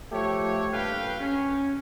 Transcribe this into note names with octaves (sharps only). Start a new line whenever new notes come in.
F3 A3 G4 C#5
G2 A#2 A4 B4 F5 G5
C#4